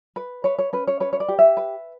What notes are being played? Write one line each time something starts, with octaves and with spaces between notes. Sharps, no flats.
B4
B4 C#5
C#5
C#4 B4
C#5
B4 C#5
C#5
D5
G4
E5
B4